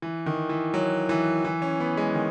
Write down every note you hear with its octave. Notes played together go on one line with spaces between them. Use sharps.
E3
D#3
E3
F#3
E3
E3
C#4
B3
G#3
D#3